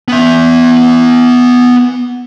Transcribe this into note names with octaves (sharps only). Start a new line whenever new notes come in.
B3 E5